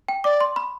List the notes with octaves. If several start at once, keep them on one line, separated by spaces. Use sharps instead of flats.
G5
D5 D6
C6
B5